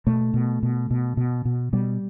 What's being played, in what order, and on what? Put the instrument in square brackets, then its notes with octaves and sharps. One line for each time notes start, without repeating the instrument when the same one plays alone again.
[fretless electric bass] B2 A3
B2
B2
B2
B2
B2
B2 G3